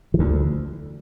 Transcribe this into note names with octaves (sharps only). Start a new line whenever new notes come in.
E3
D2 D3